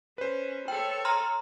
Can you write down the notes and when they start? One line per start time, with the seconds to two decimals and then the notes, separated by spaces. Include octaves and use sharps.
0.18 C#4 B4 C5
0.68 A4 C#5 G5
1.05 A#5 C6 F6